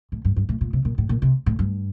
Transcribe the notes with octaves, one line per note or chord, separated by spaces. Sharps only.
A2
G2
G2
A2
A#2
C3
A#2
A2
A#2
C3
A2
G2